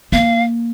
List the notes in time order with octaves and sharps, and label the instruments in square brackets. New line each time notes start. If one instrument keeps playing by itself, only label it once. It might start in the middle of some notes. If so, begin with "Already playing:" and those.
[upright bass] A#3 [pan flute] F5